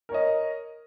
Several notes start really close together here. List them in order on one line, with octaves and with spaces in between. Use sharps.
A#4 C#5 D#5